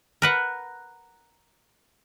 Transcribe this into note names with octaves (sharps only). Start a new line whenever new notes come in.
A#4 B4 F#5